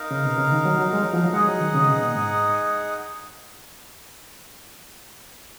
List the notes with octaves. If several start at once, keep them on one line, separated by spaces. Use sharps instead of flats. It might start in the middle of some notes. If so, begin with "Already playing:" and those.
Already playing: D#4 A#4 F5
C#3
B2
C#3
D#3
F#3
F#3
G#3
F#3
F3
F#3
G#3 D#4 G#4 D#5 F#5
F#3
D#3
C#3
B2
A#2
G#2